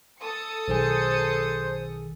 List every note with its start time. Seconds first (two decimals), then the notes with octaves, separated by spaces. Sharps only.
0.20 A4 D#6 C#7
0.68 B1 D#3 G#4 C5